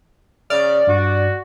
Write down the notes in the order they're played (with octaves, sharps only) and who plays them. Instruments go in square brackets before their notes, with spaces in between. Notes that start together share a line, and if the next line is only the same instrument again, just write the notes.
[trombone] C#3 [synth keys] D5 [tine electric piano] F6
[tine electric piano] G2 [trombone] F#4